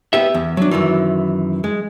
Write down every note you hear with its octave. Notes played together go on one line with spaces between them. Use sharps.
B3 G4 E5
E2
F#3 D4
F#2 A2 D#3 E3
G#3